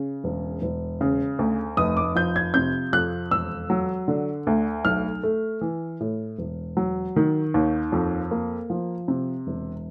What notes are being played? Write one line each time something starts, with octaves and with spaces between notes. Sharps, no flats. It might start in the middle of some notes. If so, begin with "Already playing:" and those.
Already playing: C#3
E1
E1
C#3
D2
F1 D#6
D6
F3 G6
G#6
C3 G6
F2 F#6
E1 E6
F#3
D3
D2
B1 F6
A3
E3
A2
E1
F#3
D#3
D#2
F2
A#3
F3
C3
E1